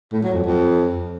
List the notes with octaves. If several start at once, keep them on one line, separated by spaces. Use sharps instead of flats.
A2
F#3
F2
F2